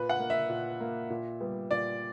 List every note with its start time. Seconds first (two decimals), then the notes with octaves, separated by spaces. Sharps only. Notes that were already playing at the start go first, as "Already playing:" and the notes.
Already playing: A#2 B4
0.09 F#5
0.20 A#3
0.30 E5
0.50 A#2
0.80 A#3
1.10 A#2
1.40 G3 B3
1.71 A#2 D5